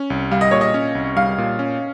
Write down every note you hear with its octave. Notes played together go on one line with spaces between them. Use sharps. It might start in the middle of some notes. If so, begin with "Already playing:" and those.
Already playing: C#4
C2
G3 F5
D#5
A#2 C#5
D#5
C#4
C2
G3 F5
A#2
C#4